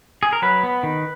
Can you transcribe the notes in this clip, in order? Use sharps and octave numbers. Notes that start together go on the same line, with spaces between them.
G#4
A#4
F#3 B4
B3
D#3